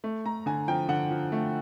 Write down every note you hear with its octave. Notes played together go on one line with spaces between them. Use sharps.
A3
A3 A#5
D3 G#5
F3 G5
D3 F#5
F3
A3